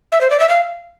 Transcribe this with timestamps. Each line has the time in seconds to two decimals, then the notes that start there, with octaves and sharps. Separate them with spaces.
0.12 E5
0.21 C5
0.30 D5
0.40 E5
0.49 F5